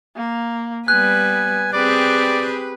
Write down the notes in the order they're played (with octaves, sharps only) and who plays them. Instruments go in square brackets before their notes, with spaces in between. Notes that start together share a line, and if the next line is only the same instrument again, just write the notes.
[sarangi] A#3
[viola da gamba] G3 B4 [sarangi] B3 [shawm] G#5 [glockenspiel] F#6
[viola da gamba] C4 G4 G#4 [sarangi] B4 [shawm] D5